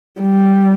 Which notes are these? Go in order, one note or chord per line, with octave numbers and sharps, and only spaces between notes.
G3